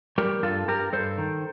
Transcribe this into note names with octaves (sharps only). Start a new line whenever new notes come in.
G3 G4 A#4
G2 F4 A4
G2 G4 A#4
G2 A4 C5
D#3